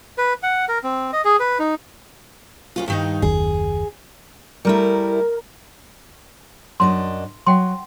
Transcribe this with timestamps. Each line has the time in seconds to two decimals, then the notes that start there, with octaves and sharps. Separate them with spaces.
0.18 B4
0.43 F#5
0.68 A#4
0.84 C4
1.13 D#5
1.25 G#4
1.40 B4
1.59 D#4
2.76 D2 C#4 F4
2.88 G2 D#3 D#4
3.22 F#1 D#2 G#4
4.65 G3 A3 E4 A#4
6.80 F#2 D4 D#5 C6
7.46 F#3 F#5 G5 C6